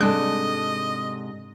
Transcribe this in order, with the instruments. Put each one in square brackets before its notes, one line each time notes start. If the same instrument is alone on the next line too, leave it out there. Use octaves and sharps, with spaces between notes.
[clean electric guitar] G#2 C3 G#3 [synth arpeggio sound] G3 F#6 [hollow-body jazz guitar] D4 A4 [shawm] D#5